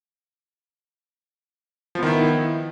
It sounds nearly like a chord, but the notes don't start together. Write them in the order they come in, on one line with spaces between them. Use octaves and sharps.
F3 B3 D#3 E4